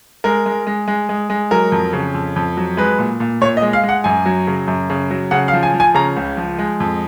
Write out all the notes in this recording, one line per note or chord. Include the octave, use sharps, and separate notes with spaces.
G#3 A#4
G#3
G#3
G#3
G#3
G#3
F#3 A#4
F2
C#3
F2
F2
F#3
G#3 B4
A#2
A#2
A#2 C#5
D#5
G#3
F5
G#3
F#5
F#2 G#5
F#3
C#3
F#2
C#3
F#3
C#3 F#5
F5
F3
G#5
F3
G#5
C#3 A#5
C#2
F3
G#3
F2